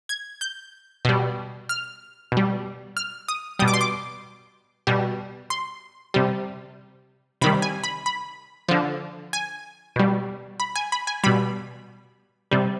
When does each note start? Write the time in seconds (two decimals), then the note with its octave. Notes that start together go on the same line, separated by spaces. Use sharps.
0.09 G#6
0.41 G6
1.05 B2 G3
1.69 F6
2.32 B2 G3
2.97 F6
3.28 D#6
3.59 B2 G3 D#6
3.68 D6
3.74 C6
3.81 D6
4.87 B2 G3
5.50 C6
6.14 C3 G3
7.41 C3 D#3 G3 B5
7.62 G#5
7.84 B5
8.06 B5
8.69 D3 F3
9.33 G#5
9.96 B2 G3
10.60 B5
10.76 G#5
10.92 B5
11.07 G#5
11.24 B2 G3 B5
12.51 C3 G3